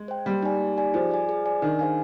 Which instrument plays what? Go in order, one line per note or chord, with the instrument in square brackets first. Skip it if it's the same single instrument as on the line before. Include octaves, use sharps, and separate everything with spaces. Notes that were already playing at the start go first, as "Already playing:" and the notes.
Already playing: [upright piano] G#3
[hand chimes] C5 G5
[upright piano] G3 [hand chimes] A#3
[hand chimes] D#4 G4 D5 G#5
A#3
D#4 G4 D5 G#5
[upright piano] F3 [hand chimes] G#4
[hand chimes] D5 G#5
G#4
D5 G#5
[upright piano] D#3 [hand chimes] D4
[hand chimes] G#4 C5 F5 G#5